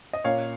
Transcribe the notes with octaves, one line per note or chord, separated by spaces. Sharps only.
D#5
A#2 A#3 C#4 C#5 F5